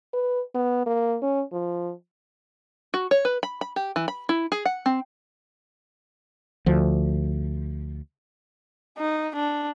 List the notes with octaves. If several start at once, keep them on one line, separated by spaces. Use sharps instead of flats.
B4
B3
A#3
C#4
F3
F#4
C#5
B4
B5
B5
G4
E3
B5
E4
G#4
F#5
C4
D2 F3
D#4
D4